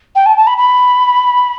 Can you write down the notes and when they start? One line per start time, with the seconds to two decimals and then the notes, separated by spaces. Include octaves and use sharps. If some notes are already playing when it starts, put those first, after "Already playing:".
0.15 G5
0.26 A5
0.37 A5
0.47 B5
0.57 B5